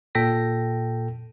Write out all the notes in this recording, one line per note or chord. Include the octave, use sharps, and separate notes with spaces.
A#2 A4 G5 A#6 B6